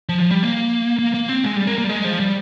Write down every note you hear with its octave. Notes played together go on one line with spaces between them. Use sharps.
F3
F3
G3
A#3
A#3
A#3
C4
G#3
G3
A#3
A#3
G3
G#3
F3
G3